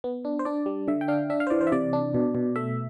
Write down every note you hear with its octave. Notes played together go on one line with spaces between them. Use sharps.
B3
D4
C5
D4 D5
G3
D3 E5
G5
D4 F5
D4 E5
F5
C5
E3 D5
C5
E5
C3 D5
D4
B2
B2
A3 E5